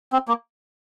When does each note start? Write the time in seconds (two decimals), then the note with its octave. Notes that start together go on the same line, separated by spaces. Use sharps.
0.13 C4
0.28 A#3